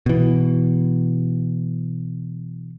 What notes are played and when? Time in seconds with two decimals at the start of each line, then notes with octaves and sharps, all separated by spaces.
0.06 B2 E3